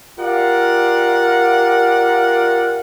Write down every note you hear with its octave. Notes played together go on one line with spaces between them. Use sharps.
F4 G4 A#4 D5 F5 F#5